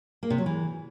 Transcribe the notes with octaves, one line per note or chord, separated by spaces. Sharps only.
A#3
C3
F#3
E3